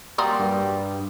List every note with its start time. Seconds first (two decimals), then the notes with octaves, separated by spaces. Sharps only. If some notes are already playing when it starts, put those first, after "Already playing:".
0.18 G3 A#3 F#4 D5 A#5 C6 D#6
0.40 G2